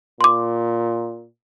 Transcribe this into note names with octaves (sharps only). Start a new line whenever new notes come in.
A#2 C6 D6